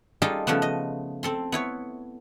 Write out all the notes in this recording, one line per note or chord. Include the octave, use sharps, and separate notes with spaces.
G3 D#4 F4 G#4 A4 D#5
C#3 F3 A3 B3
D#5
C4 A4 C6
B3 E4 C#5